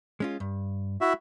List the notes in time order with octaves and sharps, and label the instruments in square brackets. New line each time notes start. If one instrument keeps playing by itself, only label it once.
[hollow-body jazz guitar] G#3 C#4 F4
G2
[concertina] E4 F#4 E5